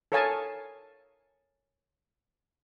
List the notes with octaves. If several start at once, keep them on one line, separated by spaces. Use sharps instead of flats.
A4 A#4 C#5 F5 G#5 A5